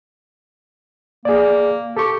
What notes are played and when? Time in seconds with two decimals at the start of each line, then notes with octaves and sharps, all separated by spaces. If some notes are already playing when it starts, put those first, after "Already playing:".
1.25 A#3 G#4 D5
1.97 G4 A4 C#6